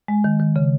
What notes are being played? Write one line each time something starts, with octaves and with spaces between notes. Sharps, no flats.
G#3
D#3
D#3
C#3